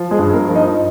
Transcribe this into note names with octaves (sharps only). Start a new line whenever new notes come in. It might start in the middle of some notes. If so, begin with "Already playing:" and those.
Already playing: F3
G#3 G#4
G2
A#3 A#4
F3
D#4 D#5